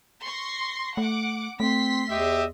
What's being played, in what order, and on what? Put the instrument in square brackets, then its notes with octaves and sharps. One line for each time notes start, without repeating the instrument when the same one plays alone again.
[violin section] C6 C#6 A#6
[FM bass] A3 [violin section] F#5 D6
[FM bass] A3 [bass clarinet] C4 [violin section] C6 B6
[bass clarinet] E2 [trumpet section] G4 D#5 E5